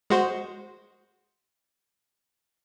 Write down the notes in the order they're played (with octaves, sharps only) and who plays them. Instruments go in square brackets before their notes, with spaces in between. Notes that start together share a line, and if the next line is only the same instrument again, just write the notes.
[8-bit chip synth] G#3 F#4 C5